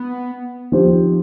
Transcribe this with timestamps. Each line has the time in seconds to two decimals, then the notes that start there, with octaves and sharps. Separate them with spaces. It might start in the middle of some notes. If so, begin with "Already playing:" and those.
Already playing: B3
0.72 F3 C4 D#4 G4 C5